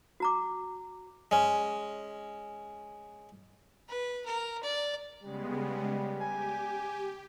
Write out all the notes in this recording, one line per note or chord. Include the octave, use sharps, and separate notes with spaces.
F#4 A#5 D6
G#3 C#4
B4
A#4
D5
C#3 G3 G#3 B3
G4 G#5